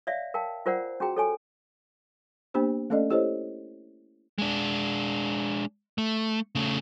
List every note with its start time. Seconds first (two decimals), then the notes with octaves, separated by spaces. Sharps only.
0.07 C#5 D5 E5 F5
0.34 A#4 F5 G5 A5
0.66 F4 A#4 C5 D5 F#5
1.00 C#4 F#4 G#4 G5 A#5
1.17 A4 C#5 G#5
2.54 A#3 B3 D4 G4 C5
2.90 A3 C#4 A4 D5 D#5
3.10 E4 G4 A4 C5 C#5 D#5
4.38 G#3 D4
5.98 A3
6.55 C#3 A3